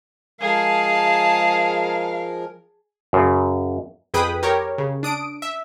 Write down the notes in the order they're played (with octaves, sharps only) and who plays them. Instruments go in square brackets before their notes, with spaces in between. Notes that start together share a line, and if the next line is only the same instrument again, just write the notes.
[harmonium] F3 G#3 A#4 [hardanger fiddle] G#4 A5 [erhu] F5
[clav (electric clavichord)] F#2 C#3
[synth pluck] F2 G#4 B4 G5 B5 D#6
G4 A#4 C#5
C#3
D4 D#6 D7
E5